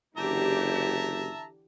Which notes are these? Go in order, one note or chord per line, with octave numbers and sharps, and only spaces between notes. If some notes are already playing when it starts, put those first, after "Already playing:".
F#1 D3 E3 G4 E5 A5 A#5